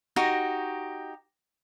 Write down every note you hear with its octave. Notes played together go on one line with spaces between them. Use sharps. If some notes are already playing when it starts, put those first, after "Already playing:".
D#4 F#4 G4